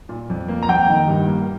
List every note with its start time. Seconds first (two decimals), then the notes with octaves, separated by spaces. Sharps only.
0.09 A#2
0.30 F2
0.48 A#3
0.63 A#5
0.68 F2 G5
0.88 D#3
1.08 G2
1.28 A#3